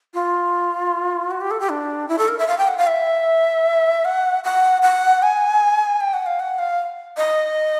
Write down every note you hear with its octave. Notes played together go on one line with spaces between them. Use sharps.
F4
F#4
G4
A4
G4
D4
E4
A4
A#4
E5
F5
G5
F#5
F5
E5
F#5
F#5
F#5
G#5
G5
F#5
F5
F#5
F5
D#5